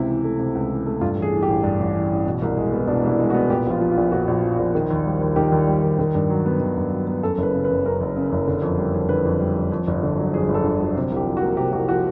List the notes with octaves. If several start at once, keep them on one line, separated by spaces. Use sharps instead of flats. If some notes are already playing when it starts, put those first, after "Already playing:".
Already playing: C#2 C3 E4
E3
A3
C3
C#2
E3
A3
G2 F4
A1 G#4
E3
G4
A1
G2 D4
A1
E3
A1
B2
C2
G#3
B3
B2 D4
C2 E4
G#3
F#4
B3
A#2 G4
A#1 F4
F3
F4
A#1
A#2 F#4
A#1
F3
A#1
D#3
D#2
G3
D#2
D#3 G4
D#2
G3
D#2
D#3
G2
F#3
B3
D#3
G2
F#3
B3
F#2 A4
F#1
B4
C#3
B4
F#1
F#2 A#4
F#1
C#3
F#1
D3
F2
G3
F2
D3 B4
F2
G3
F2
F2
G1
D3
F#3
F2 G#4
G1
A4
D3
F#3
C3
C2
G4
F3
F#4
A#3
C3 G4
C2 F#4
F3 F#4